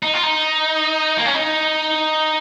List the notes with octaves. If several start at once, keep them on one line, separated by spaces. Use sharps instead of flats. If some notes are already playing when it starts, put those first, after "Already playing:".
D#4
F4
D#4
A#3
C#4
D#4